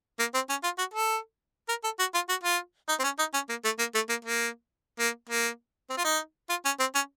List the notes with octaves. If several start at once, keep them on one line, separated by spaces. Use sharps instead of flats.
A#3
C4
C#4
F4
F#4
A4
A#4
A4
F#4
F4
F#4
F4
D#4
C4
C#4
D#4
C#4
A#3
A3
A#3
A3
A#3
A#3
A#3
A#3
C4
F4
D#4
F4
C#4
C4
C#4